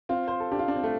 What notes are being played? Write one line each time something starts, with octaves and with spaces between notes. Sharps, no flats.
C4 F4
C5
A4
D4 G4
F4
D4
C4
A3